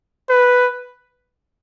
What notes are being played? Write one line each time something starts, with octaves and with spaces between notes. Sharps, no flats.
B4